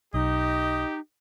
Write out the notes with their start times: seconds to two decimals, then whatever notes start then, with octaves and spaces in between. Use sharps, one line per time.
0.14 B1 D#4 G4 D#5